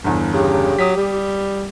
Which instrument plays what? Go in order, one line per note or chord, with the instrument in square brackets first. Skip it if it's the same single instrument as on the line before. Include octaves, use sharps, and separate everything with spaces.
[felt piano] G1 E2
[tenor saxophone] C#3 [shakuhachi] G4
[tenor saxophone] F#3 [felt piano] D#6 B6
[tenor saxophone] G3